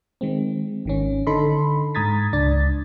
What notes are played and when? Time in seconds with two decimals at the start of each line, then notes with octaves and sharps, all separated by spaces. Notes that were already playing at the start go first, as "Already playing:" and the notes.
0.21 D#3 G#3 C4
0.85 G#1 D#3 C#4
1.27 D3 D#4 A4 B5 C6
1.95 G#2 A#5 D#6 G#6 A6 B6
2.33 C#2 D4 D5 A6